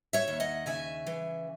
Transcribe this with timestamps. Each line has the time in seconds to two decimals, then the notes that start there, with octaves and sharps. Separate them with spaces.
0.13 C#5 E5
0.28 D#2
0.40 D#5 F#5
0.66 C#3 E5 G#5
1.07 E3